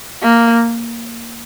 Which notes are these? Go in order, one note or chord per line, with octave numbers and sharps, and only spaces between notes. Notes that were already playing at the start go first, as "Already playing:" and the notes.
A#3